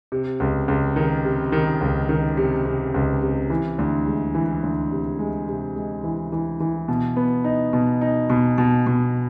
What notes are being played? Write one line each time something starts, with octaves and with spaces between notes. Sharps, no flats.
C3
C#2
C#2
D#3
C3
D#3
C#2
D#3
C3
C3
C#2
C3
E3
D2
G#3
E3
D2
C3
G#3
C3
G#3
E3
E3
E3
B2
B3
D#4
B2
D#4
B2
B2
B2